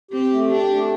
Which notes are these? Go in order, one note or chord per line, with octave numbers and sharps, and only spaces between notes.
C4 G4
A3
D4 G4
A3